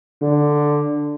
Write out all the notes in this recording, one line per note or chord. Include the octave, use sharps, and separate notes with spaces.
D3